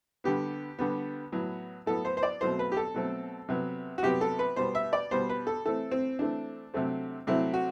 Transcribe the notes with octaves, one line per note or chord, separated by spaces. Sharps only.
D3 G3 B3 G4
D3 G3 B3
A2 F#3 B3
A2 F#3 B3 A4
C5
C5
D5
B2 F#3 A3 C4 C5
B4
G4
A4
B2 F#3 A3 C4
C3 F#3 B3
F#4
C3 F#3 B3 G4
A4
B4
B2 G3 B3 C5
E5
D5
B2 G3 B3 C5
B4
A4
E3 A3 C4 A4
C4
E3 A3 C4 D4
C3 F#3 A3 C4
C3 F#3 A3 C4 E4
F#4